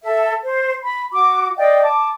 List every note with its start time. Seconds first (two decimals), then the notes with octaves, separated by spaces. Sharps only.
0.02 A4 E5
0.43 C5
0.83 B5
1.13 F#4 D6
1.57 D5 D#5 F5 G5
1.83 A5 D6